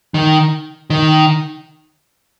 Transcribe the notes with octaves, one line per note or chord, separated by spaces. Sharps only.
D#3
D#3